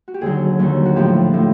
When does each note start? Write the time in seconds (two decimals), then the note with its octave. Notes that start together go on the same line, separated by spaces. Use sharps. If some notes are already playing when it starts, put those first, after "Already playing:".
0.08 F#4
0.14 G4
0.21 D#2 D3 F#3 G#4
0.59 D#2 D3 F#3
0.85 F#4
0.96 A2 F3 G4
1.33 A2 F3